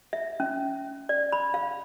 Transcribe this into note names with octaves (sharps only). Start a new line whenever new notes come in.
E5
C#4
D5
B5
F5